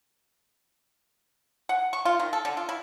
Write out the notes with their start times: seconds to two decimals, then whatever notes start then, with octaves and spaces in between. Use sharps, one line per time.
1.69 F#5
1.93 C#6
2.05 F4
2.19 D#3
2.33 A4
2.45 D3
2.57 F4
2.69 E4